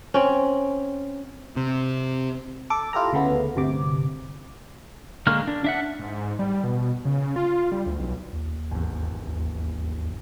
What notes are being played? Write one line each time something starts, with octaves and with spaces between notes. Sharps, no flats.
C4 C#4
C3
A4 D6
E4 F4 G4 A4 A#5
D2 C#3 A3 B3
G1 D2 C3 D6
D3 G#3 A#3 C#6 F6
D4
D4 E5 F#5
G#2
G3
B2
C#3
F4
G3
D2
B1
D#2
G#1 E2
D#2